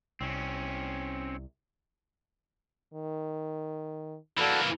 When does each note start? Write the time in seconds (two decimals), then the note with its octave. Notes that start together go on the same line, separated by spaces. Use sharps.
0.21 C2 C4 C#4
2.93 D#3
4.37 E3 A#3 F#4 A4 D5